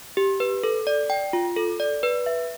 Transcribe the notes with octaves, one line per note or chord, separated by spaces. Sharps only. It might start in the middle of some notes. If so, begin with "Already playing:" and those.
G4
B4
A4
D5
G5
F4
A4
D5
B4
E5